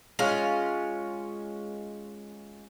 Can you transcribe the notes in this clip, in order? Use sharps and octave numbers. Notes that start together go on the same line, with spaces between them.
G#3 C#4 F4